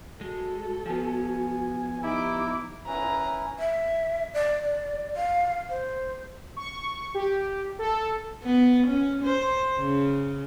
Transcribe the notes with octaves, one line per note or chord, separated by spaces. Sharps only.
G#3 F#4 A4
F3 B3 G#5
D#4 E4 G4 D6
C#4 E4 B4 A#5
E5
D5
F5
C5
C#6
G4
A4
B3
C#4
C5
C#3